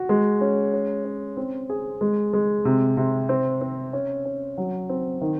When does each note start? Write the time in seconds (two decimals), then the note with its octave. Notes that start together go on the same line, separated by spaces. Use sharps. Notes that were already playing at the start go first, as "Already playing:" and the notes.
Already playing: F#4
0.09 G#3
0.41 C#4
0.73 C#4
1.05 C#4
1.37 C4
1.69 G#4
2.01 G#3
2.33 G#3
2.65 C3
2.97 C3
3.29 C4
3.61 C4
3.93 C#4
4.25 C#4
4.58 F#3
4.89 C4
5.21 D#3